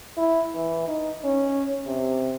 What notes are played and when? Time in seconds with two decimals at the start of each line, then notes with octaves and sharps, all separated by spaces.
0.17 E4
0.54 E3
0.88 D#4
1.24 C#4
1.86 C3